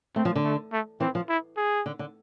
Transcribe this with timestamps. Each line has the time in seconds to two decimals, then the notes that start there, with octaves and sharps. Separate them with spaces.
0.16 A3 C4
0.25 F3
0.36 D3
0.45 A3
0.72 A3
1.00 E3 C4
1.15 F3
1.29 E4
1.57 G#4
1.86 D3
1.99 D3